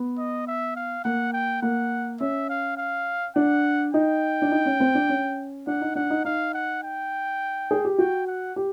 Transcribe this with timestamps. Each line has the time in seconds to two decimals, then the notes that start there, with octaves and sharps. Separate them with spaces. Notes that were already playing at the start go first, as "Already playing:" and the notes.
Already playing: B3
0.18 D#5
0.48 E5
0.76 F5
1.04 A#3 F#5
1.33 G5
1.62 A#3 F#5
2.20 C#4 E5
2.49 F5
2.77 F5
3.36 D4 F#5
3.93 D#4 G5
4.42 D4
4.52 D#4
4.65 C#4
4.80 C4
4.95 D4
5.09 C#4
5.67 D4 F#5
5.81 D#4
5.95 D4 F#5
6.10 D#4
6.25 D#4 F5
6.54 F#5
6.83 G5
7.71 G#4
7.85 G4
7.98 F#4 G5
8.28 F#5
8.56 G4